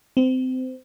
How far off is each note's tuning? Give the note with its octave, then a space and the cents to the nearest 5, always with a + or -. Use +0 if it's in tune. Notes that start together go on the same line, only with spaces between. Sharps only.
C4 -25